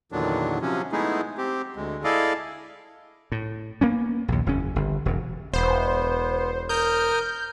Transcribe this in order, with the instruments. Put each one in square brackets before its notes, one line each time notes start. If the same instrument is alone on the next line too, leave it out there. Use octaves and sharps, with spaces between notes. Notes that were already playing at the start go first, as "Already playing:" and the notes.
[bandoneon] E2 A#2 D3 D#3 F#3 D4
C3 F3 F#3 C#4
G#3 A3 B3 D#4 E4 G#4
C4 G4
D2 G#3
E4 G#4 A4 D5 D#5 F5
[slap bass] A2
A#3 B3 C#4
A#1 D#2
F#1 E2 C#4
G1
E1 F#2
[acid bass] E1 [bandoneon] B3 [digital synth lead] C5
[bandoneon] A#4 D#6 F6 [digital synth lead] G6